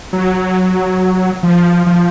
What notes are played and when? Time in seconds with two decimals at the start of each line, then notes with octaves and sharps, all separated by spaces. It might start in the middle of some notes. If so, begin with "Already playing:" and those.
0.13 F#3
1.43 F3
1.86 F3